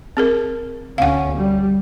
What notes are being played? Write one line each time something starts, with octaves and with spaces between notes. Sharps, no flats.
C4 G#4 A#4
D2 C#4 F5 F#5
G3